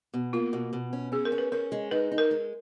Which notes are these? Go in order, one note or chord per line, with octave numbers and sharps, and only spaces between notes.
B2
A#3 F4
B2
B2
C#4
C#4 G#4
A#4
C#4
B4
C#4 A#4
G#3
D#4 B4
D#4
A#4
G#3